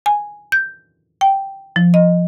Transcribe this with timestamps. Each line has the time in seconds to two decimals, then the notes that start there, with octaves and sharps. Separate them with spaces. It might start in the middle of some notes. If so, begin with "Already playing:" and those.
0.06 G#5
0.52 G6
1.21 G5
1.76 F3
1.94 D#5